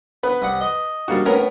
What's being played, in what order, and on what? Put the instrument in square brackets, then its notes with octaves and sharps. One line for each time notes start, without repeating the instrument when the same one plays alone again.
[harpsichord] B3 [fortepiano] B4
[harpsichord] C2 F#5
D#5
[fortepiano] G3 A#3 F#4
[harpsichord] A2 B3 [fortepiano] C#4 A#4